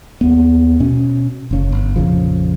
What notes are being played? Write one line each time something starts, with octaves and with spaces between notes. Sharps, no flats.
D#2 B3
B2 C#4
F#1 C#3
G1
A#1 F2 C#3 F3